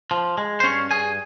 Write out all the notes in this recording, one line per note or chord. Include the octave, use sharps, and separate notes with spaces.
F3
G#3
C5
G2 C#4 C#5
G2 G#4 G#5